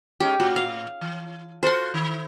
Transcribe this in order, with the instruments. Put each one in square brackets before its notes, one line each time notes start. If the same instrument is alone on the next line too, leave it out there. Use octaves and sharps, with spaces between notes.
[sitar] G#3 C#4 D#4 [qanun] G4
[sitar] A2 [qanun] F#4
[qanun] F5
[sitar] E3
[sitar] F4 F#4 A4 [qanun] C5 C6
[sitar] D#3 E4